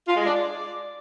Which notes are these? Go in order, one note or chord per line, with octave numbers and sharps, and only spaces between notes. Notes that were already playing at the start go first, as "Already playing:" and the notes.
F4
G#3
D4
D5